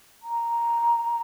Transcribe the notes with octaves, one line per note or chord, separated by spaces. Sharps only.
A#5